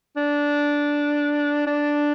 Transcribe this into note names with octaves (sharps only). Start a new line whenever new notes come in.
D4
D4